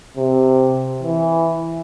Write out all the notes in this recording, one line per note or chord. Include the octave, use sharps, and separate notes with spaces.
C3
E3